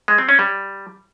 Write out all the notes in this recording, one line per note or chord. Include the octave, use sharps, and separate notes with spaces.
G#3
C4
C#4
G3